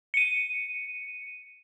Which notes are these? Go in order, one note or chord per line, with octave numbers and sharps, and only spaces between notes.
C#7 D#7